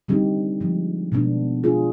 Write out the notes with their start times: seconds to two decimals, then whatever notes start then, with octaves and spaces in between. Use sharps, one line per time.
0.08 D3 G3 C4 D#4 G4
0.61 D3 F3 G#3
1.12 B2 G#3 B3 D4
1.64 G#3 D4 F4 G#4